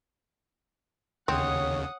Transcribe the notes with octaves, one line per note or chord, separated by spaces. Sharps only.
D#2 C#3 C4 C#5 F#5 D#6